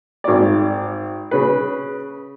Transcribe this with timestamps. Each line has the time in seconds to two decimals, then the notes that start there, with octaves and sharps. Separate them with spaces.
0.24 G#1 D5
1.31 C#3 B4